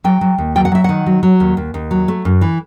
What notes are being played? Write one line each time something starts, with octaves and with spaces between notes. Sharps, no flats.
F#3 G5
F#3
D#2
F#3 G5
F#5
F#3 E5
D#3 F#5
F#3
F#3
D#2
D#2
D#2
F#3
A3
F#2
E3